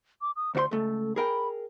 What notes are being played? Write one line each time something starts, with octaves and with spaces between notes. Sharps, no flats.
D6
D#6
D2 F#4 C5 C6
C#2 A3 A4
G#4 A#4 G5 B5